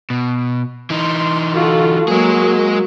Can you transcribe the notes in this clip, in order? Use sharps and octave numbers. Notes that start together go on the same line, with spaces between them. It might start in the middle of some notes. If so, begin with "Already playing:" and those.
B2
E3 D#4 C6
F4 F#4 A4
F#3 G#3 A#3 G#4